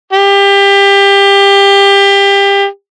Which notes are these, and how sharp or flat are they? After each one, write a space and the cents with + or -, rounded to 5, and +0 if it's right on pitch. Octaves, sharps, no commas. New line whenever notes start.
G4 +25